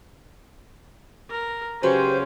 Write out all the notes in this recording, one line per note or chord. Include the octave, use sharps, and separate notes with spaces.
A#4
C#3 F#3 C#4 G4 B4 C5